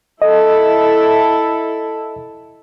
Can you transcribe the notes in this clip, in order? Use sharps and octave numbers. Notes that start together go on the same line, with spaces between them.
E4 A4 D#5